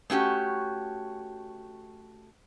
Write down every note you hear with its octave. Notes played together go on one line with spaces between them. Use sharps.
A3 C#4 F#4 G4